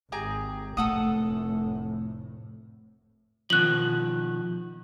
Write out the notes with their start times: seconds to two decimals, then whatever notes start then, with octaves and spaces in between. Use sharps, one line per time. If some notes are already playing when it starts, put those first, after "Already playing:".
0.12 G#1 G4 G#4 A#5
0.77 F1 A2 A3 A4 F#5 D#6
3.50 B2 D#3 F3 F#6 F#7